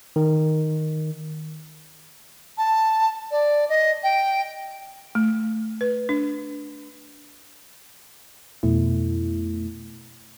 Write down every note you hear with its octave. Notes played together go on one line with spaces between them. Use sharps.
D#3
A5
D5
D#5
G5
A3
B4
D4
F2 B2 A3 E4